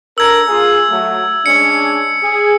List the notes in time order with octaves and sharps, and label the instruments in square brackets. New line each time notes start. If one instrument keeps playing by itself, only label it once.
[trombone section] D4 A4 A#4 [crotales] E6 G#6
[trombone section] A#3 F4 G#4
F#3 A3
[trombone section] G#3 C#4 D4 [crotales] C#7
[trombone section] G#4